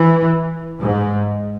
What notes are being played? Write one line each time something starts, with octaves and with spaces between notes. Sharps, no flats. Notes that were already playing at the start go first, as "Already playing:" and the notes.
Already playing: E3
G#2